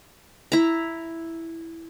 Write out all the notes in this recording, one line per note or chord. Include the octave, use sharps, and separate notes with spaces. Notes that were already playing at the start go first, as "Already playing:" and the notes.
E4 A#5